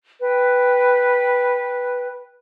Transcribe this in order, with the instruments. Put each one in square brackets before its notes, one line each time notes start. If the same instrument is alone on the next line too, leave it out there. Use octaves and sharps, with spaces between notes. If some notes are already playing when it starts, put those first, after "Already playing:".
[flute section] B4 G5